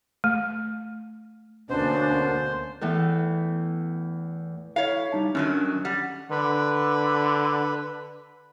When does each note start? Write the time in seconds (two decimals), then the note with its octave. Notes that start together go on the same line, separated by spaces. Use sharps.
0.24 A3
1.70 D2 B2 A#3 C#4 D4 C5
2.81 E2 A2 E3
4.76 E4 C#5 F5
5.12 G3 D#4 A5
5.35 F#2 D#3 F#3 C#4 D4
5.85 G3 F#5
6.31 D3 B4